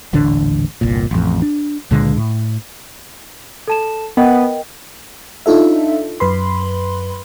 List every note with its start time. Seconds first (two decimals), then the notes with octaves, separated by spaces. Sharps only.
0.13 D#1 A1 D3 D4
0.81 G1 C2 A#2
1.11 A1 F2
1.42 D4
1.91 C#2 A#2 D3 G#3
2.16 A2
3.68 A4 A5 E7
4.17 B3 A#4 D#5 G5
5.46 D4 D#4 F4 A4 E5
6.20 F#2 B4 B5 C6